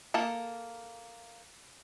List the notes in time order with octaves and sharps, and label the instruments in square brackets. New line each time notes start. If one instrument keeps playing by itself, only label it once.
[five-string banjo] A#3 A4 A5